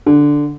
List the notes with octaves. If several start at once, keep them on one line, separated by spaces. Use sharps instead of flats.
D3